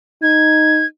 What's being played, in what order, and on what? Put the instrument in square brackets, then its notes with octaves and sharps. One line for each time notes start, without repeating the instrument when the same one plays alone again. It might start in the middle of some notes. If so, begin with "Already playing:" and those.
[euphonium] D#4 [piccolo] G#6